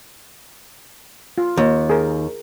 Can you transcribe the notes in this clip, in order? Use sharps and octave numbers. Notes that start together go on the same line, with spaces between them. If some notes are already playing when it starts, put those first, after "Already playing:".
F4
D#2
G#4 A#4